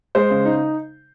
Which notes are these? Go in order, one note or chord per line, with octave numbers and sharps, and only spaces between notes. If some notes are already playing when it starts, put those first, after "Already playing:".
G#3 C5
C#3
D#4